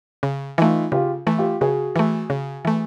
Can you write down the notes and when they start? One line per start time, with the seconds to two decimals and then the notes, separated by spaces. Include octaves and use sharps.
0.23 C#3
0.58 E3 A3 D#4 F4
0.92 C#3 F4 G4
1.27 E3 A3
1.38 F4 G4
1.61 C#3 F#4 G#4
1.96 E3 A3
2.30 C#3
2.65 E3 A3